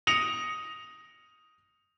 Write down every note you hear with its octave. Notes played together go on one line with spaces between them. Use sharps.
D#6 A#6 C#7 D7 F7